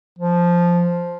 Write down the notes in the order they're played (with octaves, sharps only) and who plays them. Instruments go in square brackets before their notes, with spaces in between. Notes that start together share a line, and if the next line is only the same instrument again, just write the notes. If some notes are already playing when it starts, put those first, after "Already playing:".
[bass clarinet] F3